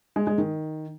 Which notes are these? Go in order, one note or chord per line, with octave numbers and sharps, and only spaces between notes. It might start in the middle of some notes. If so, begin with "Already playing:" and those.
G#3
G#3
D#3